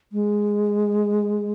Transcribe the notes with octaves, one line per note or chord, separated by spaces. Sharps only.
G#3